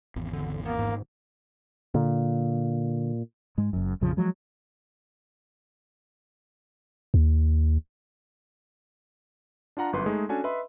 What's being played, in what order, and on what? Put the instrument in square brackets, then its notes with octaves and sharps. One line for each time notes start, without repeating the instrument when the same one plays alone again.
[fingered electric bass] G#1 E2
[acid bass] D3
[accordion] A#3 [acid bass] B3
[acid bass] G#2
[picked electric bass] A#2 [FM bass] D3
[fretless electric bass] G#2 G#3
F#1 F#2
A#1 F2 C#3 F3
F3 F#3 G#3
[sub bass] D#2
[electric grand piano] D4 F4 F#5 A#5
G1 F#2 B4 C6
G#3 A3 D#4 G#4
C#4 D4 F#4 A4 G#5
B4 D#5 E5 B5 C6